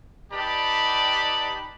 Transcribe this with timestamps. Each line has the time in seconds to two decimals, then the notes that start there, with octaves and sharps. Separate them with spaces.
0.33 D#4 G4 B4 D5 A5 B5